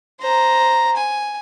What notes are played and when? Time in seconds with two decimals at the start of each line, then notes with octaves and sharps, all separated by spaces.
0.21 C5 A#5
0.97 G#5